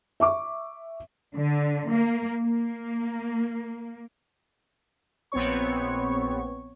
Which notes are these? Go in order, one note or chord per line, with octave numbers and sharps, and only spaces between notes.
E5 C#6 D6
D3
A#3
A#3
A#1 B3 C4 C#5 C#6